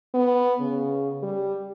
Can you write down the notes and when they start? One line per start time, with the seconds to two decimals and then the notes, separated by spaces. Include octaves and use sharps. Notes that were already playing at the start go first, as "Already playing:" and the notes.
0.14 B3
0.61 C#3
1.23 G3